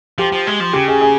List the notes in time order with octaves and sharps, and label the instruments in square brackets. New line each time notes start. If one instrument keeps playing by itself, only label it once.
[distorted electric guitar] F3 [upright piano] G4
[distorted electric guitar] F3
G#3
F3
[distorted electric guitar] C#3 [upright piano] G4
[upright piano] G#4
G#4